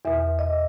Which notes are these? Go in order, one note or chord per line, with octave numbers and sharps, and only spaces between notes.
E2 B2 E5
D#5